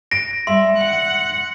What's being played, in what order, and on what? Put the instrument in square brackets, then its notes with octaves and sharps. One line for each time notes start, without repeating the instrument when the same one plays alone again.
[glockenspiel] A#6 [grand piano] D7
[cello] G3 [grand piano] E5 [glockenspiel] C6
[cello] F#5